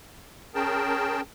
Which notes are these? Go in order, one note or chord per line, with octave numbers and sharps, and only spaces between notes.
C#4 G#4 A#4 G5 A5